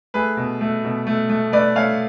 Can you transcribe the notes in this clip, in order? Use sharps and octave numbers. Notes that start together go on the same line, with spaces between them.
A3 G#4 B4
B2
A3
B2
A3
A3
A3 B4 D5
A3 C#5 F5